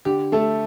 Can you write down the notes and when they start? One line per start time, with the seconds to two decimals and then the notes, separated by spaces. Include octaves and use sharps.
0.05 D3 G4
0.32 A3 A4